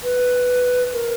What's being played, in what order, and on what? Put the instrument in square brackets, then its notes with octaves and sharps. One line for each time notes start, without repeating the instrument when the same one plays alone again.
[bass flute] B4
A#4